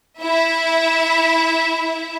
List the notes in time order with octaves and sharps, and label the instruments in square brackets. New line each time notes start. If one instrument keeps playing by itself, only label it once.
[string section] E4 E5